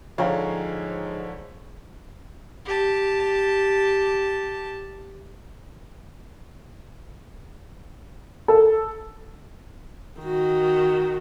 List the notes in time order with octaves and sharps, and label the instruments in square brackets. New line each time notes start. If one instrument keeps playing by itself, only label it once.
[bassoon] G#2 [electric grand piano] D3 F3 [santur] C#5 [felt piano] F5 G5 A#5
[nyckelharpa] G4 A5
[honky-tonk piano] A4
[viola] D#3 F#4